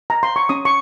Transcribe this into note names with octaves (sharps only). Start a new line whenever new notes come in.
A#5
C6
C#6
C#4 D#6
C#6